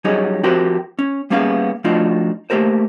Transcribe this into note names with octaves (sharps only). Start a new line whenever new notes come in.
F#3 G3 C#4 D#4 G#4
F3 C4 F#4 G4 A#4 C5
C#4
G3 A#3 B3 C#4 G#4 F5
F3 A3 D4 D#4 F4 F#4
A3 A#3 G4 A#4 C5